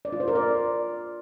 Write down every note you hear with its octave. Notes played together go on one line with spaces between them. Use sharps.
D5
F4
C5
A#4
D5